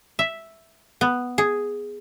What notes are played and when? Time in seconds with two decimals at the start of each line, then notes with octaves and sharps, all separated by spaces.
0.19 E5
1.01 B3
1.38 G#4